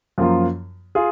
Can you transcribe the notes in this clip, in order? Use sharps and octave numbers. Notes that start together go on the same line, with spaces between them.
F#2 F3 A#3 F4
F4 G#4